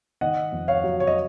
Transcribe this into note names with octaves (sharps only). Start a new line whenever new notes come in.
D#3 D#5 F#5
F2
C#5 F5
F#3
C#5
D#5